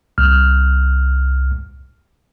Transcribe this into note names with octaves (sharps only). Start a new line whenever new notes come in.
C2 F6